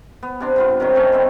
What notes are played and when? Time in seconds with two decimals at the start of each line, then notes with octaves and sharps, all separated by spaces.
0.23 B3
0.40 C3 D4 C6
0.56 G2 B3 F4
0.80 C3 D#3 F#3
0.94 C3 D#3 A3 C#4
1.12 G3 B3 C4